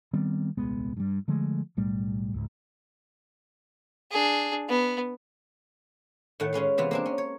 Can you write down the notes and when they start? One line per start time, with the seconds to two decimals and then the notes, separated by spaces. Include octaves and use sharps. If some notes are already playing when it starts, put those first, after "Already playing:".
0.13 D#3 G3 B3 C4
0.57 D#1 C2 G#3 B3
0.97 G2 G3
1.28 D3 F3 G#3 A3
1.77 B1 A2 G3 A3
2.34 C#2 G#2
4.11 D4 G#4
4.69 B3
6.40 A2 D#3 A3 F#5
6.53 G#3 C#4 B4 F5
6.78 C3 E3 B3 F4
6.91 A#3 C4 D4
7.06 C#4
7.18 C#5